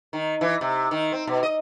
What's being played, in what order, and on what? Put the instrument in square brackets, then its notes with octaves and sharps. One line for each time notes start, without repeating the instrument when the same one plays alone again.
[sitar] D#3
E3
C3
D#3
C4
B2
D#5